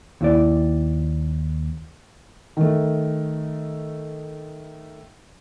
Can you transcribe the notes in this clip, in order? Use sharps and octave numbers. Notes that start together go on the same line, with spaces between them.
D#2 E4 D5
D#3 A3